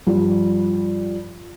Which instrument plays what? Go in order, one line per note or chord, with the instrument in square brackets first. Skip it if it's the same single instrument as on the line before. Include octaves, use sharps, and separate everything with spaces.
[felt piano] G2 F3 G3 F4